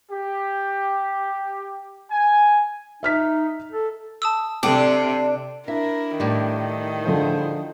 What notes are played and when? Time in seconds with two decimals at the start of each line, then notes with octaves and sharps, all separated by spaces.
0.11 G4
2.11 G#5
3.03 D#4 E5 F6 B6
3.72 A4
4.22 A5 D#6 E6
4.63 C3 D4 A4 G5
5.68 D4 E4 A#4 E5
6.20 A2 D#3 G3
7.05 D3 F3 E4 G#4 C5